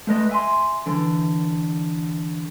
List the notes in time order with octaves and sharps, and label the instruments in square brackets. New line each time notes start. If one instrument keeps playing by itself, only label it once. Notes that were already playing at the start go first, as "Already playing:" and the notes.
[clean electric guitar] A3 B4 D#5
E5 G#5 C6
D3 E3